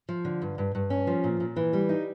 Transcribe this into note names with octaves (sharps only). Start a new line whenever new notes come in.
F3
D3
G2
G2
G2
C#4
F3
A#2
A#2
E3
G3
D#4